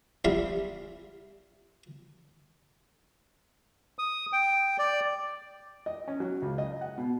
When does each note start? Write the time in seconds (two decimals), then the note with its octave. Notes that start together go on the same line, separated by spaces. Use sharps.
0.25 C3 G3 F4 G#4 E5 F5
3.99 D#6
4.33 G5
4.79 D5
5.86 D#5
6.08 C#4
6.20 F#3
6.42 C#2
6.58 D#5
6.81 F#5
6.98 B2